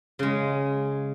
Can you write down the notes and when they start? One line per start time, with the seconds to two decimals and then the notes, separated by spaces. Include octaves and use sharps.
0.19 C#3 G#3